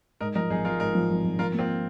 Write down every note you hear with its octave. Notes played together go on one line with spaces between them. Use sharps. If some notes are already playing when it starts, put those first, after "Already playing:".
G#2 A#4 D#5
F3 A#4 D#5
G#1 D#4 G#4
G#1 F4 A#4
G#2 A#4 D#5
F3
G#1
G#1
F3 F4 A#4
A#3 C4 F4